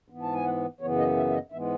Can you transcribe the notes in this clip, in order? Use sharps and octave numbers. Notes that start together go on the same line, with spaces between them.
G#2 E3 B3
A5
G#5
F#5
F#2 C#3 E3 B3 C#5
D#5
E5
E5
D#5
G#2 E3 G#3 B3 E5